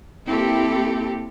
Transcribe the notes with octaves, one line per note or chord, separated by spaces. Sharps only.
A#3 C4 E4 G4 A4